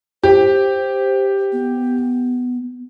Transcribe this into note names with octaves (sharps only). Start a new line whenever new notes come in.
G4 C5
B3